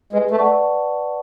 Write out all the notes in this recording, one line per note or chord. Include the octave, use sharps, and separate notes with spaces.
G#3 B4
A3
D5 F#5 A5 C#6